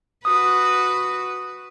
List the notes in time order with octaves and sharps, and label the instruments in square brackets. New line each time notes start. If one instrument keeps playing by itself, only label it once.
[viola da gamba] F#4 B4 [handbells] D#6